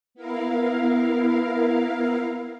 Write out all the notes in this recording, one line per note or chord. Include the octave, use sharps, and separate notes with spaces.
B3 E4 A#4 F5